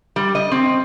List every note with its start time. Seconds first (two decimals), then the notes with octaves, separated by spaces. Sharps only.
0.16 G3
0.35 D#5
0.52 C4